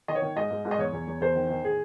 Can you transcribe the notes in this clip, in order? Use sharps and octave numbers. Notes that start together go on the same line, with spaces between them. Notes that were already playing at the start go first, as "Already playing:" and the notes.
D#3 D#5
C#5
D#3
G#2 D#5
G#2
G#2
D#5
E2 C#5
E2
E2
E2 C5
D#3
D#3
A2 G#4